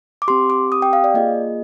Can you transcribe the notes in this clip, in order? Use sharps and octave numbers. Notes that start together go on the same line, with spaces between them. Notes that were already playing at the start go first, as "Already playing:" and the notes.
D6
C4 G4 C6
D6
D#6
G5
F5
D5
A#3 F4 G#4 D#5